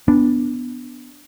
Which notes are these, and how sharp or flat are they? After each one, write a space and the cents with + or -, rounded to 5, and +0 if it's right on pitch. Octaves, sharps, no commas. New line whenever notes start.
B3 +0 D4 +0